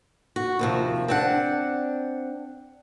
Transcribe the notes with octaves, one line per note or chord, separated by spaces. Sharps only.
F#4
D#2 C3 F3
C4 D4 F#5